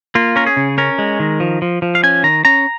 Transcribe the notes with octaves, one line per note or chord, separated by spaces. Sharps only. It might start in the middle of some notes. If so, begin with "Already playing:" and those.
A#3 F4
C#4 A#4
G#4
C#3
C#4 A#4
G#3
D#3
F3
F3
F3
F5
C#4 G#5
D#3 A#5
C#4 A#5